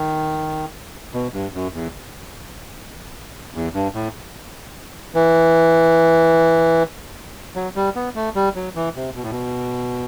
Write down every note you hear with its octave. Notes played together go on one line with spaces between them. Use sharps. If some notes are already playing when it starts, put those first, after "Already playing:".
Already playing: D#3
B2
G2
F#2
E2
E2
G2
A2
E3
F#3
G3
B3
A3
G3
F#3
E3
C3
B2
A2
B2